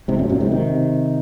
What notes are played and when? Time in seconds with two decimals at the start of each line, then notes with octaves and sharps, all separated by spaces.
0.08 G#2 C3
0.19 F#2 A#2
0.29 F#2 A#2
0.40 G#2 C3
0.51 C3 D#3